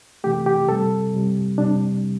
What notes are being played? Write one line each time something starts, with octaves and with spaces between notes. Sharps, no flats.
C3 E3 A3 G4
G4
C3 G3 A4
C3 G3
C3 G3 D4